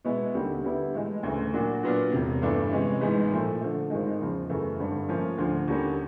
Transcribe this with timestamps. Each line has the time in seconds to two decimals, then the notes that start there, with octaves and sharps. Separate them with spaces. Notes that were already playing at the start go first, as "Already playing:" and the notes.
0.05 B2 G#3 B3 E4
0.34 D#2 D3 G3 C4
0.64 D3 G3 B3 E4
0.94 A2 E3 G#3
1.23 D2 C#3 E3 A3
1.53 A#2 F#3 A#3 D4 F#4
1.83 A#2 F#3 B3 D4 F4
2.12 E1 E2 C3
2.42 G1 G2 E3 A3 D4
2.71 C3 E3 G#3 C#4
3.01 A1 G#2 E3 G#3 B3
3.31 A#2 F3 A3
3.61 D3 F3 A3
3.90 G#1 G#2 D#3 G#3
4.20 E2 C#3 F3
4.49 F#2 C#3 E3 A3
4.78 G#1 G2 D3
5.08 A2 F3 A#3 C#4 F4
5.38 D2 D3 F3
5.68 D#2 D3 G3 A#3 C#4